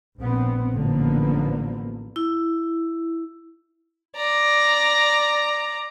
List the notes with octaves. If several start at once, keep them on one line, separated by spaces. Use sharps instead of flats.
A#1 B3 C4
A1 A2 D3 F3 A#3 B3
E4
D5 A#5